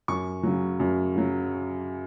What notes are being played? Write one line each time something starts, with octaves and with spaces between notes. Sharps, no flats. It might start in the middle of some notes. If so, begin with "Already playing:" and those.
F#2 C#6
C#3 F#3
F#2
C#3 F#3